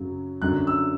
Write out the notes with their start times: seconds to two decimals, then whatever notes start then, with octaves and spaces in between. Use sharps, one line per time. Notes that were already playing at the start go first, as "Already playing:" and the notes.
Already playing: F#2 C#3 F#3
0.42 F#2 D3 F#3 F#6
0.67 E6